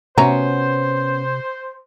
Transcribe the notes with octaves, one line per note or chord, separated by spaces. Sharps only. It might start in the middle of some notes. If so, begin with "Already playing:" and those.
C3 B3 C#4 F#4 C5 E5 A#5